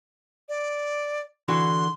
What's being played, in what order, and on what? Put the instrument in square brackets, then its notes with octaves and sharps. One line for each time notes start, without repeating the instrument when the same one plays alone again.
[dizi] D5
[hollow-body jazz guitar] D3 E3 F#4 [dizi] C6